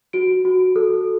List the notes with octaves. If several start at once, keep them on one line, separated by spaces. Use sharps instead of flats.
F#4 D7
F#4
A4